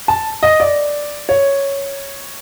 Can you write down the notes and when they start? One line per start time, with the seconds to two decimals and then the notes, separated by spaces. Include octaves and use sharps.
0.08 A5
0.43 D#5
0.60 D5
1.29 C#5